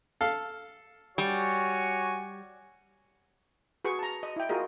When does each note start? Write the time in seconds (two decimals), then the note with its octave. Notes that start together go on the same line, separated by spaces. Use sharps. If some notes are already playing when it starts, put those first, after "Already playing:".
0.21 A4 F5
1.18 G3 F#4 C#5 G#5
3.85 F#4 G#4 B4 C#6
3.99 A5 A#5
4.23 D#5
4.36 E4 G5
4.49 F4 F#4 G#4 A#4 D#5